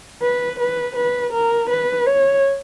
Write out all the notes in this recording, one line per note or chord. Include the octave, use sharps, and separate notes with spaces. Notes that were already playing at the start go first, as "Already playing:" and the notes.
B4
B4
B4
A#4
B4
C#5